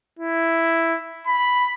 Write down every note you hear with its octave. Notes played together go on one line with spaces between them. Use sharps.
E4
B5